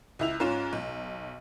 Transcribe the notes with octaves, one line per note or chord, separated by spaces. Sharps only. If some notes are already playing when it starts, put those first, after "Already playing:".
C#2 E4 F7
G#2 C#4 F4 E7
B1